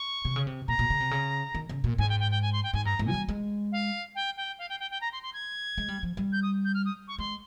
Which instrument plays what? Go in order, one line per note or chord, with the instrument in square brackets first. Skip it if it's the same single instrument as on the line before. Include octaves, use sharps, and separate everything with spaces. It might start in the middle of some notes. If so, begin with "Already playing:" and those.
Already playing: [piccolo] C#6
[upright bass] C3
C#3
C3
[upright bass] A#2 [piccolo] A#5
[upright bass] A#2
C#3
C3
C#3
D#3
C#3
A#2
[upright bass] G#2 [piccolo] G#5
[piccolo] G5
G5
G5
G#5
C6
G5
[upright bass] G#2 [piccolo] G#5
[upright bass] G2 [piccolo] A#5
[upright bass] G#2
[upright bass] F3 [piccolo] G#5
[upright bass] G3
G#3
[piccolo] F5
G5
G5
F5
G5
G5
G5
A#5
C6
C6
G#6
[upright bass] G#3
G3
F3
G3
[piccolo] G6
D#6
G6
F6
D#6
C#6
[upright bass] G#3 [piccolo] C6